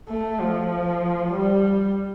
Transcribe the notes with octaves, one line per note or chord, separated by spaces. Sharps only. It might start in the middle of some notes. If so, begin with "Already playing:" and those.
A3
F3
G3